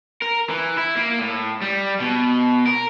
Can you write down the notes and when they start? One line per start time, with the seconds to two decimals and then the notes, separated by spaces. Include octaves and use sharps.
0.22 A#4
0.49 E3
0.77 E4
0.96 A#3
1.19 A2
1.61 G3
2.00 B2
2.66 A#4